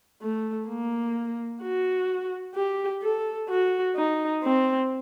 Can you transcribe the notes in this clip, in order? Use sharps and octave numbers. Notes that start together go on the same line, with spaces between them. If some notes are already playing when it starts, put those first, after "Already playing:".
A3
A#3
F#4
G4
A4
F#4
D#4
C4